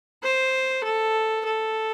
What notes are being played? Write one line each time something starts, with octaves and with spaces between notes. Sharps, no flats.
C5
A4
A4